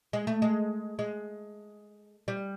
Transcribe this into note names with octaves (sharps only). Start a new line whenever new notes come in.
G#3
A3
G#3
G#3
G3